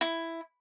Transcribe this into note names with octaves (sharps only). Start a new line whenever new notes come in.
E4